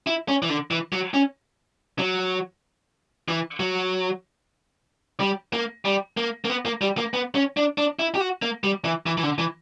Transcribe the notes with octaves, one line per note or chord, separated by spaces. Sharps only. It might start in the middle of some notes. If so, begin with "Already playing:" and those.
E4
C#4
E3
D3
E3
F#3
C#4
F#3
E3
F#3
G3
A#3
G3
A#3
A#3
B3
A#3
G3
A#3
B3
C#4
D4
D4
E4
G4
F#4
A#3
G3
E3
E3
E3
D3
E3